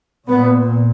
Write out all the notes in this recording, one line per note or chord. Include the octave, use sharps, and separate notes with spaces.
A#2 B3